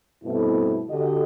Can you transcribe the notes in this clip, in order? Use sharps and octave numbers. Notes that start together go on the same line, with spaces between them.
G2 B2 A3 C4 E4
D3 F#4 G4 A4 D#5